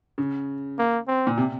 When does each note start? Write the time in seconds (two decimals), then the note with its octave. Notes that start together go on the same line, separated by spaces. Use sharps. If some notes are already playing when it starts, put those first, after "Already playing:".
0.18 C#3
0.78 A#3
1.07 C4
1.27 A#2
1.37 C3